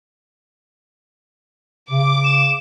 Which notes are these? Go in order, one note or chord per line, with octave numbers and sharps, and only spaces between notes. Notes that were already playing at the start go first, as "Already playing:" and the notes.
C#3 D6
E7